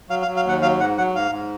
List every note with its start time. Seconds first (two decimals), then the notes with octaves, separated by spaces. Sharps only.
0.09 F#3 F5
0.22 F5
0.28 F#3
0.36 F5
0.44 D#2 F#5
0.62 F#3 F5
0.79 G#2 F#5
0.98 F#3 F#5
1.15 G#2 F5
1.32 G#2